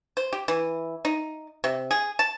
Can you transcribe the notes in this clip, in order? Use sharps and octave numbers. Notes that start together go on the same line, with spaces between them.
C5
G4
E3
D#4
C3
G#4
A5